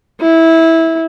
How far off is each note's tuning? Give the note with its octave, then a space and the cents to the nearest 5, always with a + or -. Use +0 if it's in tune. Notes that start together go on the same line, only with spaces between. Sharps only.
E4 -15